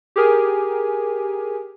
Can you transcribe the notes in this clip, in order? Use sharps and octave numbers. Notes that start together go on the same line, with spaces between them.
G4 G#4 A#4 G#5